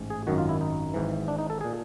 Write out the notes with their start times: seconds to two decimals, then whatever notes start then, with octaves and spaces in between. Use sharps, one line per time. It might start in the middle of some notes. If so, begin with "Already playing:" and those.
Already playing: A1 G#2
0.10 G#4
0.27 G#1 F#2 D#3 F#4
0.38 F4
0.49 E4
0.61 D#4
0.94 G#1 G#2 E3
1.28 D4
1.38 D#4
1.50 A4
1.61 A#2 G#4